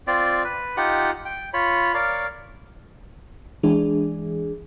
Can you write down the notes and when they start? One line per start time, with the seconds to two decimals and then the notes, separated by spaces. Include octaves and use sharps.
0.07 C4 F4 D5
0.44 B4
0.77 D#4 F4 G4 F#5
1.25 G5
1.53 F4 C#5 B5
1.94 A#4 C#5 D5 F5
3.63 E3 G#3 D4 G#4